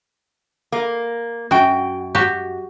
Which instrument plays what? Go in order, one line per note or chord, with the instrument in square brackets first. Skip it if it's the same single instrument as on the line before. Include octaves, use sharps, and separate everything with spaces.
[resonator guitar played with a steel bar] A#3
[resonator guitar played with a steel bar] F#2 G5 [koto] F#4
[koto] F#4 G4